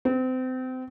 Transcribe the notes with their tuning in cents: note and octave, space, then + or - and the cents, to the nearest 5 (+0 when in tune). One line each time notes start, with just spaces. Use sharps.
C4 -30